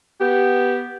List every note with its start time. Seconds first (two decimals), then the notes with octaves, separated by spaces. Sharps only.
0.20 B3 G4